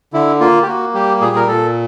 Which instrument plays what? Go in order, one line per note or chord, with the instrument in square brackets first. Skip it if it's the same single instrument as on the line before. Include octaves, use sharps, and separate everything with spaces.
[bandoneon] D3 E4
A#3 F4
G4
A#3 F#4
G3 G4
A#2 G#4
A#4
A#2 A4